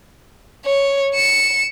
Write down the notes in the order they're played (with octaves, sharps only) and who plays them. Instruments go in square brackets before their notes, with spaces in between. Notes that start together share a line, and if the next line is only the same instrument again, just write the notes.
[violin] C#5
C#7 E7